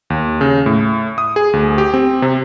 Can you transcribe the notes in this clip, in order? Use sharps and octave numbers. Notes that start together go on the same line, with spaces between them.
D#2
C#3
A2
D#6
G#4
D2
G4
C4
C3